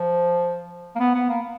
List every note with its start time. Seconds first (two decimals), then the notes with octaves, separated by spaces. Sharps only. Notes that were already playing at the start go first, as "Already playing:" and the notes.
Already playing: F3
0.95 A#3
1.00 B3
1.15 B3
1.29 A#3